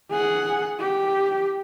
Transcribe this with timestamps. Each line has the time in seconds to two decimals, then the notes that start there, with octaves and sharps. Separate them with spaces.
0.11 G#4 F#5
0.80 G4